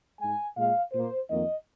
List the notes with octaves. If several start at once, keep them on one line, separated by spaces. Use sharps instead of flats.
G#2 G#3 G#5
A#2 G#3 F5
A#2 A#3 C5
F2 D#3 A#3 D#5